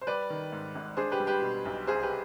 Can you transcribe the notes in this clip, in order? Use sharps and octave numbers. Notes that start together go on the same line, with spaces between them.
C5
G3 B4 D5
D#3
G#2
G#1
D4 G#4 C5
G4 B4
G3
G4 B4
B2
B1
C2 G#4 C5
G4 B4